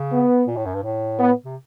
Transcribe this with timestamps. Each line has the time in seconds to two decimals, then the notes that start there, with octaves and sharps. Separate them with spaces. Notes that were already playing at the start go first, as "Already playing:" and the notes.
Already playing: C#3
0.12 B3
0.47 A#2
0.57 A2
0.66 F#2
0.75 G2
0.83 A2
1.19 B3
1.44 C3